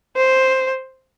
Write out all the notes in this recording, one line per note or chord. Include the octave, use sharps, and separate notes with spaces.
C5